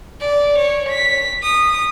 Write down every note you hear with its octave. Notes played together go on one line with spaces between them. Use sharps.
D5
C#5
B6
D#6